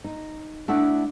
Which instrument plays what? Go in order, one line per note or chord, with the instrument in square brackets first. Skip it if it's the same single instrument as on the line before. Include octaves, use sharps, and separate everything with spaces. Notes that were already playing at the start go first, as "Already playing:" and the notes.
[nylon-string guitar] D#4
A3 D4 E4 D5 F#5